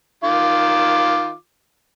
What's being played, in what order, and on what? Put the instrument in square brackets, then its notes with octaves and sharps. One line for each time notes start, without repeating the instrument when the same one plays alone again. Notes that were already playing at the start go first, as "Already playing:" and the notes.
[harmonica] D#3 F4 D6